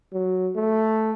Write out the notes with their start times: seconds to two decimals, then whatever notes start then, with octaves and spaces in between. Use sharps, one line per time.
0.13 F#3
0.56 A3